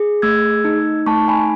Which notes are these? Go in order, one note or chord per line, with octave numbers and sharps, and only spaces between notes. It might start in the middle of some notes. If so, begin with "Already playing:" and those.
Already playing: G#4
A3 E6 G#6
D#4
A3 A5 C#6
G#5 B5